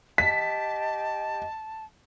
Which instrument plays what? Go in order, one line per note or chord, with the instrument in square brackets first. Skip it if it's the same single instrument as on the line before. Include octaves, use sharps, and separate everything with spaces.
[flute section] G4 D#5 G5 [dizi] A5 [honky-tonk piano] B6